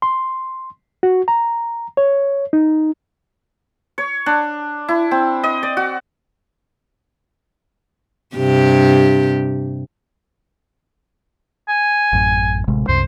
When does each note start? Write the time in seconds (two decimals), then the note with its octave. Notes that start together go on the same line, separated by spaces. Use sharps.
0.02 C6
1.03 F#4
1.28 A#5
1.97 C#5
2.53 D#4
3.98 C#5
4.26 D4
4.88 E4
5.11 C4
5.43 D#5
5.63 D5
5.77 F#4
8.37 G2 C3 G4
11.69 G#5
12.13 A1 F#2
12.68 A1 C3 G#3
12.88 C2 F#2 C3 C5